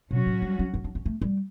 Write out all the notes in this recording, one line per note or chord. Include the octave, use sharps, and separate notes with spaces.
B2 F#3 C#4 F#4
A2
G3
C#4
B3
D4
C#4
A3
G3